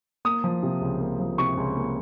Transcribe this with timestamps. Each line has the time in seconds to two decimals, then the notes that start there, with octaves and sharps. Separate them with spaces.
0.25 A#3 D#6
0.44 F3
0.63 C3
0.81 C#2
1.00 A#3
1.20 F3
1.38 C3 C#6
1.57 C#2
1.76 A#3